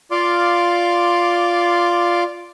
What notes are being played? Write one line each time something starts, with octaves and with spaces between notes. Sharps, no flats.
F4 D5 F5 C6 D6